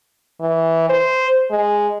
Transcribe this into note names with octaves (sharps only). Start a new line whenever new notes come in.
E3
C5
G#3